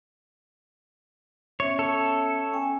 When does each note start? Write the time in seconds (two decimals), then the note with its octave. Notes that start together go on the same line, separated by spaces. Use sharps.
1.60 B3 C#4 C#5 E5
1.79 A4 C#5
2.53 C#4 G5 G#5